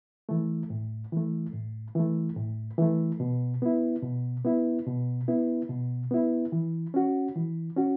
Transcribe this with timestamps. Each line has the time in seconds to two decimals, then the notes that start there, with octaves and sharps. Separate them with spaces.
0.29 E3 A3
0.70 A2
1.12 E3 A3
1.53 A2
1.95 E3 A3
2.36 A2
2.78 E3 A3
3.20 B2
3.62 B3 E4
4.03 B2
4.45 B3 E4
4.87 B2
5.28 B3 E4
5.69 B2
6.11 B3 E4
6.52 E3
6.94 C#4 F#4
7.36 E3
7.77 C#4 F#4